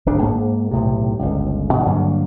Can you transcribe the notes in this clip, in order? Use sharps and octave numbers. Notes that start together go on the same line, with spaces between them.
D1 G#1 C#3 D4
G#2 A#3
B1 A2 C3
G1 C#2
B2 E3
G2 D3 F#3 A#3